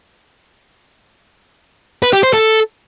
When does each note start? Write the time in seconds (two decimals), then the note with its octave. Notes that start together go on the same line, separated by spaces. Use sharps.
2.03 B4
2.13 G4
2.23 C5
2.33 A4